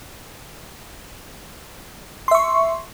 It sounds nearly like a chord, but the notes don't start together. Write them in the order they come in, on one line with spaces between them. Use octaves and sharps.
C6 E5 C#6